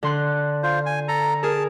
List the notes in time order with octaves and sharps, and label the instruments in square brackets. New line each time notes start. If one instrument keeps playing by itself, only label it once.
[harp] D3 C6 F#6
[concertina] F4 C5
G#5
A4 A#5
[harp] G#4 A#4 [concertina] A5